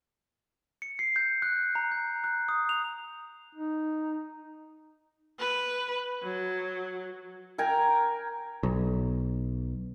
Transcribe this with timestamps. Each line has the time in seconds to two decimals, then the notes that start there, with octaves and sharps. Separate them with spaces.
0.82 C#7
0.99 C7
1.16 G6
1.42 F#6
1.75 A#5
1.92 G6
2.24 F#6
2.49 D#6
2.69 F7
3.55 D#4
5.39 B4
6.23 F#3
7.58 A#4 G5 G#5 A#5
8.63 B1